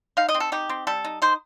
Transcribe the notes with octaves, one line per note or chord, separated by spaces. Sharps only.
D#4 F5
D#5
C4
A4
D#4 G4
C4
G3 A4
D#4
D#4 C5